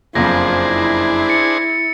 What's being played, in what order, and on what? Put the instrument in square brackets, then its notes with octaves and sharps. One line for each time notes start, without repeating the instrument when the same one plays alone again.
[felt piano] F#1 F2 [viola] F3 [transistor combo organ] D4 G#4 C5 [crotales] A#6
[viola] E4
[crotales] A6 C#7